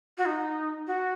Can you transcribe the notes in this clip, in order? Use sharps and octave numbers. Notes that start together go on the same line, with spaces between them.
F#4
D#4
F#4